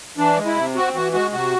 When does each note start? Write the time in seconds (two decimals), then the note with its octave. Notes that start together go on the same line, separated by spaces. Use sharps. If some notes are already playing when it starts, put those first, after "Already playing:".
0.18 E3 D4
0.37 G#3
0.46 E4
0.56 C3
0.75 C4 F#4
0.94 E3 F#4
1.13 G#3 F#4
1.32 C3 F#4